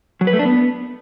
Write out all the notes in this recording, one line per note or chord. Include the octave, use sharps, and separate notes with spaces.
F#3
B4
A3
D4
B3